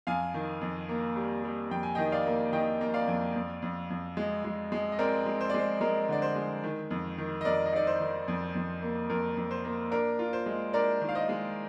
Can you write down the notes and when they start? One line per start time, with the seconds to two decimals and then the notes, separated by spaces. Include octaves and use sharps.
0.07 F2 F5 G#5
0.34 D#3
0.61 F2
0.89 A#3
1.16 G3
1.44 G3
1.71 F2 G5
1.83 G#5
1.95 D#3 D#5 G5
2.12 D5 F5
2.26 A#3
2.52 D#3 D#5 G5
2.81 A#3
2.94 D5 F5
3.08 F2
3.35 F2
3.62 F2
3.90 F2
4.17 G#3
4.45 G#3
4.72 G#3
4.92 D#5
4.99 C4 A#4 D5
5.26 G#3
5.41 C5
5.49 D5
5.54 G#3 C5
5.81 G#3 A#4
6.09 D3 D5
6.22 C5
6.36 G#3
6.64 D#3
6.91 F2
7.18 D#3
7.41 D#5
7.45 F2 A#4 D5
7.66 D#5
7.73 D#4 D5
7.87 C5
8.00 D#3
8.28 F2
8.55 F2
8.82 A#3
9.10 F2 A#4
9.37 F2
9.51 C5
9.65 A#3
9.91 D4 A#4
10.19 F4
10.33 C5
10.46 G#3
10.73 D4 A#4 D5
11.01 D#3
11.09 F5
11.15 C5 D#5
11.29 G#3